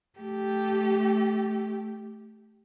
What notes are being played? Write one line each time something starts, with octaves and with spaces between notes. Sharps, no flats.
A3 G4